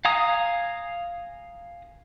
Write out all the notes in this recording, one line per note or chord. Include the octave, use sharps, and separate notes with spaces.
F5 G#5 A#5 D#6